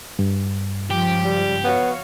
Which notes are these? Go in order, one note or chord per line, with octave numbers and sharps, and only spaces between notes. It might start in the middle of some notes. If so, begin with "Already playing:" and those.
G2
G#2 C#3 F3 G4
G3
B3 F#4 C#5 F5